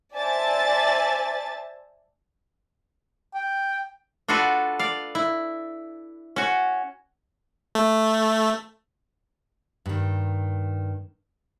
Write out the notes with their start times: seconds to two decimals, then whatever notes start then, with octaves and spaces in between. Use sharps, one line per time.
0.15 C5 D5 E5 G#5 A5 A6
3.34 G5
4.28 D4 F4 F#4 A4 B4
4.79 D5 F5
5.15 E4
6.36 C#4 F#4
7.75 A3
9.86 G2 D#3